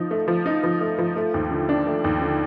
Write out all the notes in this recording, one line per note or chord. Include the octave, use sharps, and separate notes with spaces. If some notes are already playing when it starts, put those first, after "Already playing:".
Already playing: F3 D#4
A3
F3
D#4
F3
A3
F3
A3
D#2
D3
D4
A3
D#2
D3